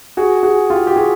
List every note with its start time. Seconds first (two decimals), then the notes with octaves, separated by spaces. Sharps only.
0.17 F#4 G#4
0.43 F#4 G#4
0.70 F4 G4
0.87 G4
0.96 F#4 G#4